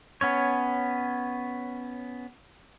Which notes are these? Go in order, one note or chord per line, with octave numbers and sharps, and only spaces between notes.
B3 C#4 C#5